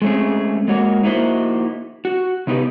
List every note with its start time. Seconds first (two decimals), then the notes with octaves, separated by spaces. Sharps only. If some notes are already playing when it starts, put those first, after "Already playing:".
0.02 G#3 A3 C4 C#4 G#4
0.68 G#3 A#3 F#4 C#5
1.03 A#3 D#4 E4 F#4 C5
2.05 F#4
2.47 C3 B3 D#4 G4 B4